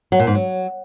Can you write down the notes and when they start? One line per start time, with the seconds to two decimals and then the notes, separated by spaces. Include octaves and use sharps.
0.12 F#3
0.19 A#2
0.27 G#2
0.34 F#3